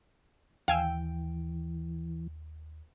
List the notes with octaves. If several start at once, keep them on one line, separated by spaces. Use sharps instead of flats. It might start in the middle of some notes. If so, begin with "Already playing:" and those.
D#2 E3 F5 G5 G#5 E6